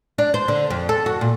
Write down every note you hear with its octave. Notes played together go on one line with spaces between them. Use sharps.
D4
C5
D3
F2
A4
F#4
A#2